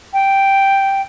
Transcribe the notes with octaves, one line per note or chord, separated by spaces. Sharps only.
G5